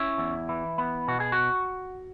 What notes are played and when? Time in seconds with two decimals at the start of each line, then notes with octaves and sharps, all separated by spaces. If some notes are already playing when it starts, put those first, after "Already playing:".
Already playing: C#4 E4
0.18 E2
0.49 E3
0.78 B3
1.08 B2 F#4
1.20 G#4
1.32 F#4